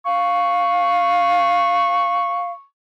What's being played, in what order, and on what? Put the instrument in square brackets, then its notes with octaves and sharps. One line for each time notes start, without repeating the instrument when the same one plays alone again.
[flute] F5 [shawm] C#6